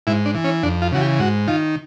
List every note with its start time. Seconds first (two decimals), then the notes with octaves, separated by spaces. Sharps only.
0.07 G#2 E4
0.26 D4
0.35 E3
0.44 C#4
0.63 F2 D4
0.82 F4
0.92 C#3 E3 F#4
1.01 G4
1.19 G#2 F#4
1.47 D#3 F4